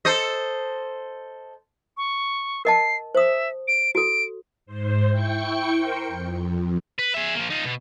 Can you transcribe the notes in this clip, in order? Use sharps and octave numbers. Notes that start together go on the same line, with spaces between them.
A4 C5 D#5
C#6
A#4 D#5 A5 C7
C5 E5 D#6
D7
F#4 A4 D7
G#2 C5
E4 G5 C#6 C#7
A#4 C5 G5
F2
B4
G#4 E5
F3 A#3
D#4 F4
B2